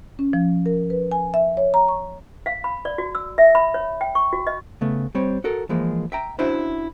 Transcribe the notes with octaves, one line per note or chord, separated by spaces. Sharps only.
C#4
F3
A#4
B4
G#5
E5
C#5
A#5
C#6
F5
B5
D5
F#4
E6
E5
B5
C#5
G5
C#6
F#4
D#5
C#3 A3 B3
G3 C4 C#5
F#4 A4 A#4
E3 F3 G#3 A#3
E5 G5 A#5
C#4 D4 E4 F#4 C5 E5